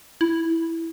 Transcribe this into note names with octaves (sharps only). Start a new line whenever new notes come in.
E4